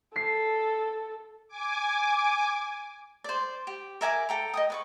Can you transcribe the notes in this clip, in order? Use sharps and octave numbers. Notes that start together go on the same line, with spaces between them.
A4 C7
G#5 D6
C5 D5
G4
A#4 E5 G#5 D6
A4 G5 A#5
D#5 G5 D#6
B4 D5 C#6